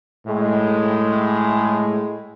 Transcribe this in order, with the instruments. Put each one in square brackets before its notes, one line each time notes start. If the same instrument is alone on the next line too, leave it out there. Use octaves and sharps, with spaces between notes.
[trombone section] A2 G#3